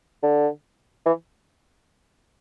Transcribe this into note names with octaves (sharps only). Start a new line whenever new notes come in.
D3
E3